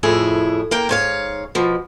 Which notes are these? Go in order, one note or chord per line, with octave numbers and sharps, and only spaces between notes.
F2 A2 E4 G#4
A#3 A#4 G5
G#2 C#5 F5
B2 F3